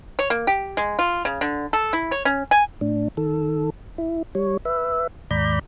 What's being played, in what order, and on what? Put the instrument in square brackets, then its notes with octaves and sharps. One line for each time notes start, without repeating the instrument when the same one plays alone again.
[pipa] C#5
A#3
G4
G#3
F4
C#3
D3
A4
E4
C#5
C#4
G#5
[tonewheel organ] A2 D4
D#3 A4
E4
G3 C#5
B4 E5
D#2 G#2 D5 A#5 B5 G6